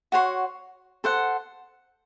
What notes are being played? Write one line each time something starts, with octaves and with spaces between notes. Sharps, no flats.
F#4 C#5 F#5 C6
A4 C5 F#5